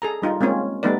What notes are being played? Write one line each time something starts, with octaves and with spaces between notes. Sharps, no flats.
G#4 A4 A#5
G3 D#4 F4
G#3 A#3 C4 C#4 F4
G3 A3 B3 D#4 B4 D5